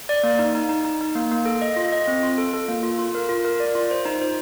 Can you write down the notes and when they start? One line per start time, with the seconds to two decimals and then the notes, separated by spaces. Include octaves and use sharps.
0.09 D5
0.24 A#3
0.39 D#4
0.55 D#4
0.69 D#4
0.85 D#4
1.01 D#4
1.15 A#3
1.31 A#3
1.46 A4
1.62 D#5
1.76 F4
1.92 D#5
2.07 C4
2.23 F4
2.38 A4
2.54 A4
2.68 A#3
2.83 F4
2.99 F4
3.15 A#4
3.29 F4
3.45 A#4
3.60 D5
3.75 F4
3.91 C5
4.06 D#4
4.22 C5